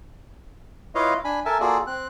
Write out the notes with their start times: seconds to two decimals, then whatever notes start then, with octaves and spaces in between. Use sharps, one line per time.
0.95 E4 F4 B4 C#5 D#5 F5
1.24 D4 G#5 B5
1.46 A4 A#4 E5 G#5 A5
1.61 A#3 F4 F#4 G#4 A4 D5
1.87 C4 F#6